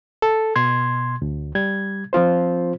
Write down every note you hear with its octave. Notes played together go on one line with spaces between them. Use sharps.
A4
B2 C6 G#6
D2
G3 G#6
F3 C4 F4 C5